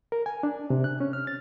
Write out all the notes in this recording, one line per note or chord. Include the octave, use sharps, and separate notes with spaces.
A#4
G#5
D4
C3
F#6
C#4
F6
A6